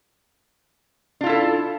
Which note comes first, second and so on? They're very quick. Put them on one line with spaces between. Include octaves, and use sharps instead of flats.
D4 F4 E4 A4